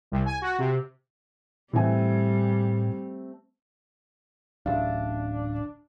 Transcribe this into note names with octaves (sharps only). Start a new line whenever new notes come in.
C2
G#5
F#4
C3
A2 E3 G3 A3 C4 G#5
D1 A1 D4 E5 F5